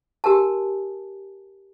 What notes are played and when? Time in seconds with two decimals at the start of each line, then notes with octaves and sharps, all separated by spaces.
0.24 G4 A#4 G#5 A5